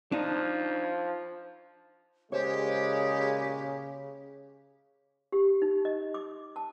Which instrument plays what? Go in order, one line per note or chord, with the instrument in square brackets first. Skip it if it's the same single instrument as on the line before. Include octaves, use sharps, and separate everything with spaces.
[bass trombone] F3 [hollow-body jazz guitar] D4 D#4
[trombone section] A#2 G#3 [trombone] C#3 [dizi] G4 [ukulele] C5 C#5
[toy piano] G4
D#4
D#5
D6
A5